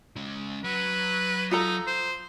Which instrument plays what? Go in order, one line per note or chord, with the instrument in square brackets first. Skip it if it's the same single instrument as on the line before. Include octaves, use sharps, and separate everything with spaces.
[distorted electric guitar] C#3 G#3
[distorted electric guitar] F#3 [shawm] B4
[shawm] D#4 [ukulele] F4 A4 A#5
[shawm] C5